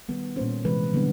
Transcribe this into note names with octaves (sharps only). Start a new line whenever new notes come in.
D#3 G3 B3
A#2 G3 A#3 C#4 C5
C3 E3 G#3 B4
D3 G3 B3